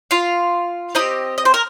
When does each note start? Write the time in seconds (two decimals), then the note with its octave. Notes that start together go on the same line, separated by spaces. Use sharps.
0.11 F4 F5
0.95 C4 D#4 G4 D#5
1.38 D#5
1.45 C5
1.54 A#4